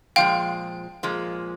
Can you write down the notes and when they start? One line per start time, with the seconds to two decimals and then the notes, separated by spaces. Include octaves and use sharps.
0.16 A#2 F3 G#3 F5 G5
1.03 A#2 F3 G#3